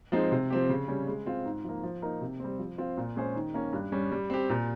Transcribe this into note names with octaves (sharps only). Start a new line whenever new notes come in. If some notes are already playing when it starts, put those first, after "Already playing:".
F3 G#3 C4 D#4
C3
F3 C4 G4
C#3
G3 C#4
G#3
C4 F4
G#2
F3 A#3
F3
A#3 D#4 A#4
C3
G3 C4
F3
C4 F4
A#2
G#3 C#4 G#4 C5
D#3
A#3 C#4
G2
G3 C#4
G3
C4 G4
A#2